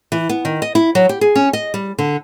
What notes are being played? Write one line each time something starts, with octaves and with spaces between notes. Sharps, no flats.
E3
B3
D#3
D#5
E4
F#3
G4
G#4
C#4
D#5
G3
D3